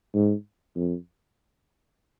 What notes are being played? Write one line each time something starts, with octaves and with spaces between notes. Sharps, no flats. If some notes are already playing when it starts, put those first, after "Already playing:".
G#2
F2